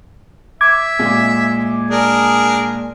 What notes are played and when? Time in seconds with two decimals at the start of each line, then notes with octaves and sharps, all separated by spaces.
0.61 E5 D6 G#6
0.99 A#2 G#3
1.90 D4 G#4 A#4